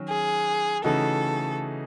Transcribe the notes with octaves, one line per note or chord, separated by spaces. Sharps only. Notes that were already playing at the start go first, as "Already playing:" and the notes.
Already playing: D#3 F#3 C#4
G#4
C#3 E3 A3 D#4 F#4 A4